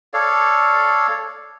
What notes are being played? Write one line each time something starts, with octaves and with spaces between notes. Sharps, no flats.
A4 C#5 D5 F5